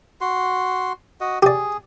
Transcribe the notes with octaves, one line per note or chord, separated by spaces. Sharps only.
F#4 C6
F#4 D#5
G4 G#4 D5